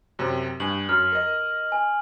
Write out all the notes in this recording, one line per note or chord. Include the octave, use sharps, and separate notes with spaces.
F#2 C3
G2 G#5 F#7
F#2 F6
A#4 D#5
G#5